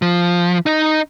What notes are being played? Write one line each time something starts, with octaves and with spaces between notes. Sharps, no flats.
F3
D#4 D#5